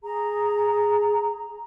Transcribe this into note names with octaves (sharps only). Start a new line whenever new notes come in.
G#4 A#5